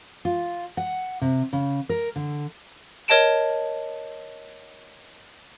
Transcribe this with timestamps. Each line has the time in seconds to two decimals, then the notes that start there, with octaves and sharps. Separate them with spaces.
0.25 F4
0.77 F#5
1.22 C3
1.53 C#3
1.89 A#4
2.16 D3
3.08 A#4 C#5 D#5 A5 D7 E7